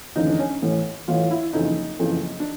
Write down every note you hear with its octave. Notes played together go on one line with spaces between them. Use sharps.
F1 D#2 C#3 E3 D#4
D4
C#4
A1 A2 E3
A1 A2 E3 F4
E4
F#1 F2 C#3 E3 D#4
F#1 F2 C#3 E3
D4